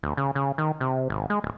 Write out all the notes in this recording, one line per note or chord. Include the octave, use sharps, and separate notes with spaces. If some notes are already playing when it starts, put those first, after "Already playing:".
D2
C#3
C#3
D#3
C3
G#1
G#3
D1